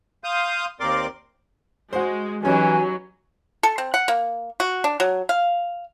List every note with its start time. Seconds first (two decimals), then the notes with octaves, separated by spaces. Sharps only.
0.24 F5 C6 D#6 G6
0.80 D#2 C4 A#4 D5 C6 D6
1.93 G#3 F#4 C5
2.43 E3 F#3 G3 C#4 D#4 G#5
3.63 A4
3.78 C4
3.94 F#5
4.08 A#3
4.60 F#4
4.84 D4
5.00 F#3
5.29 F5